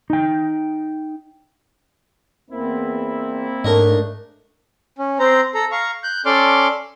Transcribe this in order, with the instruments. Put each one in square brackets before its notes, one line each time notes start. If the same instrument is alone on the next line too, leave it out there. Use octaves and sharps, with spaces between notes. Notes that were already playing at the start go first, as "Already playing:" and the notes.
[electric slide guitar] D#4 G5
[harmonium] E2 [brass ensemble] A#3 C4 E4
[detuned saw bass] G#2 [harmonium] A3 D4 [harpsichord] A#4 C#5 D#5
[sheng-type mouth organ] C#4
C4 C5 A#5
A4 A#5
F5 A#5 C#6
F#6 G6
C#4 A4 D5 C6 D6 F6